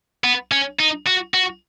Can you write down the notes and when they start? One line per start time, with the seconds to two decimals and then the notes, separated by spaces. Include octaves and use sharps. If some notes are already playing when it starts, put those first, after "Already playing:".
0.24 B3
0.52 C#4
0.79 D#4
1.07 F#4
1.34 F#4